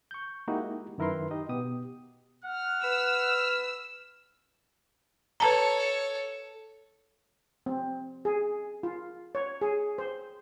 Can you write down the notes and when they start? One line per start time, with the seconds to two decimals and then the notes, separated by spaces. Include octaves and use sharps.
0.11 C#6 G6
0.48 G#3 A#3 D#4 E4 F#4 G4
0.98 F#2 D#3 E4 A#4 B4 C6
1.31 D#4 G4 D#5
1.49 B2 B3 G4 D#6
2.44 F#5 F6
2.84 B4 E6
5.40 A4 B4 C#5 A5 A#5
7.66 C4
8.25 G#4
8.83 F4
9.35 C#5
9.61 G#4
9.98 C5